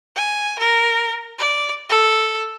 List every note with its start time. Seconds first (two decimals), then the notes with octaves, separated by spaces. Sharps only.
0.16 G#5
0.59 A#4
1.38 D5
1.89 A4